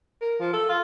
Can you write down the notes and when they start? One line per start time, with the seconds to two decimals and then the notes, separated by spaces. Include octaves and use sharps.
0.21 A#4
0.40 F3
0.53 A4
0.69 F4